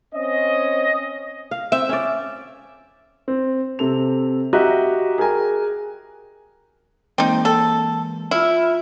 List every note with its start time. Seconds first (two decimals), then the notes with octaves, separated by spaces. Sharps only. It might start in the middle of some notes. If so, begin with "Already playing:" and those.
0.15 C4 C#4 D#5
1.51 F5
1.72 C4 E5
1.89 C#4 C5 D5
3.28 C4
3.79 C3 C4 A4 F7
4.53 F#4 G4 D#5 E5 A#5 F#6
5.18 G#4 A#4 G5 G#5 A#5
7.18 E3 G#3 A#3 C4 D#4
7.45 A4
8.31 E4 F4 E6 F6